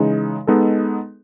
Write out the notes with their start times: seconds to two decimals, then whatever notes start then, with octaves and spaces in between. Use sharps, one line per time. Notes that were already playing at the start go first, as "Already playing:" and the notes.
Already playing: C#3 E3 G#3 D#4
0.47 G#3 B3 D#4 A4